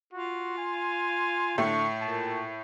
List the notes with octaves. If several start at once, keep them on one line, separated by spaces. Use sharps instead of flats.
F4 F#4
G#5
A2 D3 A3 C#6
A#2 A5